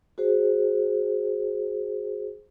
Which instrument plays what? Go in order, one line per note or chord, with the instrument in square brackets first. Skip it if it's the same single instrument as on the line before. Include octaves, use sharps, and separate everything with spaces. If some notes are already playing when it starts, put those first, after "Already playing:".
[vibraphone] F#4 G#4 C5